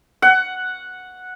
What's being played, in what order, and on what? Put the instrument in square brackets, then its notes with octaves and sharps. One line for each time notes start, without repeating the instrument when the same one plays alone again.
[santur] F#5